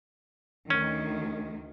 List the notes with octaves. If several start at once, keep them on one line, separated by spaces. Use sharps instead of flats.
D2 D#3 C#4